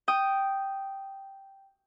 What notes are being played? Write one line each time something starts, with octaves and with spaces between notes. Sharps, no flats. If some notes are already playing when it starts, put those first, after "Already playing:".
G5 D#6